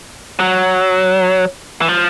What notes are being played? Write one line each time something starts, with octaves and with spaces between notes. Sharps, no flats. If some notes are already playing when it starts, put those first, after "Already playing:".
F#3
E3
F3